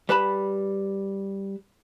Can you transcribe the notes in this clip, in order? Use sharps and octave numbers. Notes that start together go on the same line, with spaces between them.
G3 B4 A5 B5